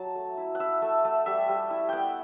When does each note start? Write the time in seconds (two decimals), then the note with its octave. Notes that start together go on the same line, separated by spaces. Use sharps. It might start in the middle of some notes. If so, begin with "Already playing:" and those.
Already playing: F#3 A5
0.16 A3
0.37 E4
0.55 F#5
0.60 E4 E5
0.82 A3
1.05 A3
1.26 G3 E5
1.49 G3
1.71 E4
1.89 B3 F#5 G5